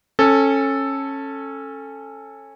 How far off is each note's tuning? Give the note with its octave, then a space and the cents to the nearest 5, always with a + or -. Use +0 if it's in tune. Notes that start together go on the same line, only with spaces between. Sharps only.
C#4 -20 A4 +0